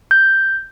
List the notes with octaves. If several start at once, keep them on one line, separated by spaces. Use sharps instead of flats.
G6